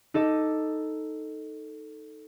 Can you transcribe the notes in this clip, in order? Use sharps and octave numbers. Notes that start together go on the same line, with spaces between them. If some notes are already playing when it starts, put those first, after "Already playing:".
D#4 A4 D#5 D6